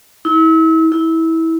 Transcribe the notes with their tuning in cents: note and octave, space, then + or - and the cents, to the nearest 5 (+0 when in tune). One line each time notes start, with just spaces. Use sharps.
E4 -35
E4 -20